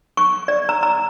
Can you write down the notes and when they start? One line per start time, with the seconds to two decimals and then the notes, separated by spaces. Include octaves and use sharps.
0.17 C#6
0.48 D5
0.69 A#5
0.83 A#5